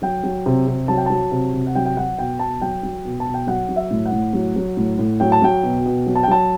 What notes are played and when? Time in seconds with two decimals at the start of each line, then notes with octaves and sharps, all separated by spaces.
0.02 F#3 G5
0.24 F#3
0.46 C3
0.67 C3
0.88 F#3 A5
0.97 G5
1.06 F#3 A5
1.31 C3
1.53 C3
1.67 F#5
1.75 F#3 G5
1.86 G5
1.97 F#3 F#5
2.18 B2 G5
2.39 B2 A5
2.61 F#3 G5
2.83 F#3
3.05 B2
3.20 A5
3.27 B2
3.34 G5
3.47 F#3 F#5
3.69 F#3
3.76 E5
3.91 A2
4.06 F#5
4.12 A2
4.33 F#3
4.56 F#3
4.77 A2
4.99 A2
5.20 F#3 G5
5.32 A5
5.42 F#3 G5
5.63 B2
5.86 B2
6.07 F#3
6.15 A5
6.23 G5
6.28 F#3 A5